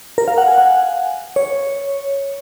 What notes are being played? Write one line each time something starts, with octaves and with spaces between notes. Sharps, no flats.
A#4
F5
F#5
G#5
F#5
C#5